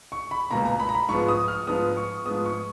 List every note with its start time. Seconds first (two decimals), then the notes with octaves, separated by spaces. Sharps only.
0.12 C#6
0.31 B5
0.50 C#2 B2 A#3 A#5
0.65 A#5
0.80 B5
0.89 A#5
0.95 B5
1.08 G#2 F3 G#3 B3 C#6
1.28 D#6
1.48 F6
1.67 G#2 F3 G#3 B3 D#6
1.97 C#6
2.26 G#2 F3 G#3 B3 D#6
2.45 C#6